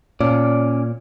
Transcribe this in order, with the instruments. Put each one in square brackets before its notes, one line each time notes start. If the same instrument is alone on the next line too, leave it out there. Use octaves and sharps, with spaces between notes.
[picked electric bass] A#2 [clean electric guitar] C#4 D5